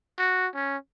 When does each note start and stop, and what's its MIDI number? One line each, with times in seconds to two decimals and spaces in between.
0.19 0.47 66
0.55 0.77 61